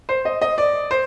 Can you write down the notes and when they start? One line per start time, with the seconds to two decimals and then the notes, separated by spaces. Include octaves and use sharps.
0.09 C5
0.25 D#5
0.42 D#5
0.58 D5
0.91 C5